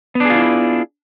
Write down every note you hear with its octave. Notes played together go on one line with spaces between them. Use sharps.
B3 D4 E4 F4 G#4